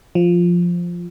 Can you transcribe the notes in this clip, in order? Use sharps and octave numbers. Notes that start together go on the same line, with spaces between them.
F3